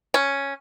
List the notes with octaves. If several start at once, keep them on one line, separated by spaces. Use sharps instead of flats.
C#4